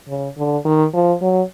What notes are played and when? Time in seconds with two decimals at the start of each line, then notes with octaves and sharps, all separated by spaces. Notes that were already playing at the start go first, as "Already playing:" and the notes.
0.08 C#3
0.37 D3
0.65 D#3
0.93 F3
1.21 F#3